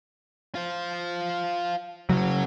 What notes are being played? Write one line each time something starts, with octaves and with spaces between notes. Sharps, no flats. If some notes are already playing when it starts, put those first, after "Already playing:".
F4 C5
C#3 F#3 F#4 C#5